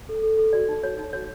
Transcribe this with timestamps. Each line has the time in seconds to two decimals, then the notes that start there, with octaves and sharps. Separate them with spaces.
0.09 A4
0.23 A4
0.38 A4
0.53 F#4 D5
0.69 D#4
0.83 F#4 C#5
0.98 D#4
1.13 F#4 C#5